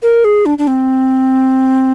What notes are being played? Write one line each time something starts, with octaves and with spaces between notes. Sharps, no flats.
A#4
G#4
D4
D4
C4